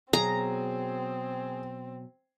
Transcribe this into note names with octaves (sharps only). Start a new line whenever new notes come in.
B2 F#3 C4 G#4 A#5